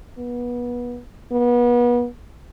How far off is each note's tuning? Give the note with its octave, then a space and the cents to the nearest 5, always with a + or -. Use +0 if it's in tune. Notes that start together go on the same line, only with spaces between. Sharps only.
B3 -25
B3 -30